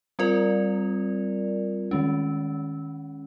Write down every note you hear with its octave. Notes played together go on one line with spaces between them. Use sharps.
G3 C4 F4 A#4 D5
D#3 G#3 C#4